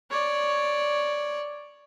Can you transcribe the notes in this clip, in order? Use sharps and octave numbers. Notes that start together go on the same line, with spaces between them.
C#5 D5